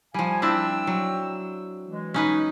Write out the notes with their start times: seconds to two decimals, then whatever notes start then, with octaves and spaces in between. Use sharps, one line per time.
0.14 F3 G3 F5 G#5
0.42 C4 D4 E4 G5 E6
0.87 F#3
1.86 E3 G#3
2.14 C#4 D#4 B4